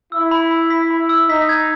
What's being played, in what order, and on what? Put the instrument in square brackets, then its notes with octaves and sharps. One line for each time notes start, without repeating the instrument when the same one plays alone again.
[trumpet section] E4 [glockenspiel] E6
[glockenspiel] B5
B5
B6
B5
E6
[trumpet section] D#4 [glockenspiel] B6
[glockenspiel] G#6